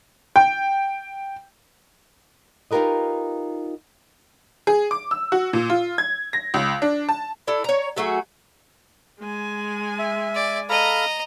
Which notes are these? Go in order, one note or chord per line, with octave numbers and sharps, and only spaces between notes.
G5
D#4 F4 G4 A#4 B4 D#5
G#4
D6
E6
F#4
A#2
F4
G#6
A#6
C#2
D4
A5
D4 E4 A4
C#5 A#5
F#3 A3 F#4 G#4
G#3 G#5
E5
D5
A4 D#5 F5 A#5 B5